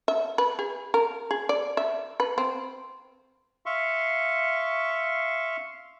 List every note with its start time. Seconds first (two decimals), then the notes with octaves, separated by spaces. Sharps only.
0.08 E5
0.38 B4
0.59 G#4
0.94 A#4
1.31 G#4
1.49 D5
1.77 E5
2.20 B4
2.38 C4
3.66 E5 F5 C6 C#6